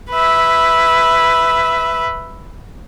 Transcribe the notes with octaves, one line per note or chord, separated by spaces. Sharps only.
B4 E5